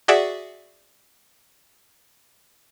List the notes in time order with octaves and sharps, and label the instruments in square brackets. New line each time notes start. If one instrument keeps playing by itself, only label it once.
[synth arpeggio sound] F#4 G#4 D5 E5 F#5